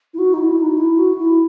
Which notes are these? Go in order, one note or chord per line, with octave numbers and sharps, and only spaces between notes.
E4
F#4
D#4
E4
D#4
E4
F#4
E4